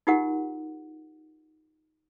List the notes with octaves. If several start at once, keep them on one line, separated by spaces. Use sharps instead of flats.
D#4 F4 G4 A#4 F#5